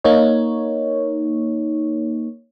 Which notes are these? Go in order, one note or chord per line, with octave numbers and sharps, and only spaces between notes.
A#3 D#4 C#5